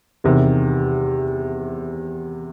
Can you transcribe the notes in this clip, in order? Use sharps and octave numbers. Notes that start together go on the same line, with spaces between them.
E2 C3 D#3